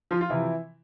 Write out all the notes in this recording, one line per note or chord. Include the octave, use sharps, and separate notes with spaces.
F3 F4
F4
C3 E3 F3 E4